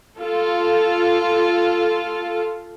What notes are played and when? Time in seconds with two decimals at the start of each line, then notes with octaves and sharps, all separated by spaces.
0.18 F4 A4